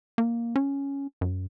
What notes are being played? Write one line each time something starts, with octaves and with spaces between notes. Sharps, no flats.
A#3
C#4
F#2